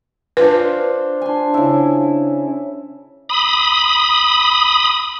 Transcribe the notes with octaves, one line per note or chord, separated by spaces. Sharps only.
D4 F4 B4 C5
D4 G#5 C6
C#3 E4
B5 D#6